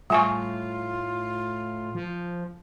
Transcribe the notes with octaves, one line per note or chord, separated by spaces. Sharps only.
A2 G3 F4 G#5 C#6
F3